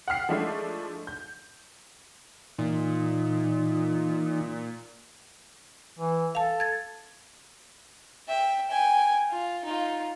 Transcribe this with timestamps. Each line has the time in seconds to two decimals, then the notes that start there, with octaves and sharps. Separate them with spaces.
0.08 F#5 G5 F6 C7
0.29 F3 G#3 A3 D4 E4
1.07 G6
2.58 A#2 E3 D#4
5.99 E3
6.35 A4 F5 A5
6.60 G#6 A6
8.28 E5 G5
8.70 G5 G#5
9.30 F4
9.65 D#4 F4